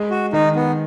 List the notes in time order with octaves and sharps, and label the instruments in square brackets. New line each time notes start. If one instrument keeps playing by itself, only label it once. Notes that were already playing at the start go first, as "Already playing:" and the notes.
Already playing: [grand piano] G#3
[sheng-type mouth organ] F#4
[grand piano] D#3 [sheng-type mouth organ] D#4
[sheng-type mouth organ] B3